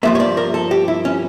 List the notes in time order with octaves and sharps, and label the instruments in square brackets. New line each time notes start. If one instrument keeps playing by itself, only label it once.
[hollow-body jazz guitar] G2 F3 A#3 E5
C#5
D5
A#4
A4
G4
E4
C#4